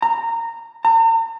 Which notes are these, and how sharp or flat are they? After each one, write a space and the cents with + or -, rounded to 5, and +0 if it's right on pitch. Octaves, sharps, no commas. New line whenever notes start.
A#5 -20
A#5 -45